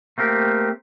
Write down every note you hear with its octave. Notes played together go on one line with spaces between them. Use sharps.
A3 A#3 C4 G4